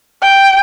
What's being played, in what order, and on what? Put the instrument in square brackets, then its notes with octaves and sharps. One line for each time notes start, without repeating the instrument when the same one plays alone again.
[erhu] G5